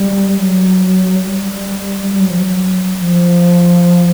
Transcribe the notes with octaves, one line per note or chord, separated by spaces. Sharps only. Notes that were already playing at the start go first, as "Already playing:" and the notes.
Already playing: G3
F#3
G3
G3
F#3
F3
F#3
F3